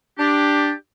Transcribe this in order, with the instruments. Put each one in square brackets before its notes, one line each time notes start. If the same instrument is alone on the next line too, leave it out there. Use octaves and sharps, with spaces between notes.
[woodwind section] D4 G4